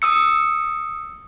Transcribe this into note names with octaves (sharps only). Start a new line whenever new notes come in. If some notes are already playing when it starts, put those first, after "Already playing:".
D#6 E6 C#7